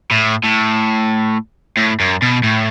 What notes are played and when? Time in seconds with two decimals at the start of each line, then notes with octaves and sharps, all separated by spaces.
0.11 A2
0.44 A2
1.77 A2
2.00 F#2
2.22 B2
2.43 A2